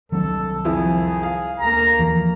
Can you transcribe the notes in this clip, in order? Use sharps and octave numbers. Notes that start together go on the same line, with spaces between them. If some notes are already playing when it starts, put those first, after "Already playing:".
C2 D#3 F#3 C4 A4
F2 F3 E4 G#4
F5
D2 A#3 A#5
E2 E3 F3